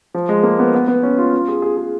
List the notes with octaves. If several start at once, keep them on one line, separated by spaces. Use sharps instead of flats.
F3
G#3
A#3
B3
B3
B3
C#4
F4
F4
G#4
G#4
G#4